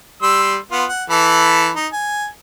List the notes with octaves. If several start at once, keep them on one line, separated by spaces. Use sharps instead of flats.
G3 C6 E6
B3 F4
F#5
E3 A4 B5
D#4
G#5